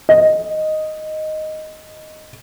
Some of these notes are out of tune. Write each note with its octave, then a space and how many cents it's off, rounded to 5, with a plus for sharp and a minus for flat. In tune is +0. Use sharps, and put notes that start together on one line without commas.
D#5 +0